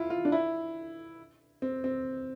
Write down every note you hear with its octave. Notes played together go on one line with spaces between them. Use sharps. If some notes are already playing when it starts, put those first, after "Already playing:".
Already playing: E4 F4
F4
D4
E4
C4
C4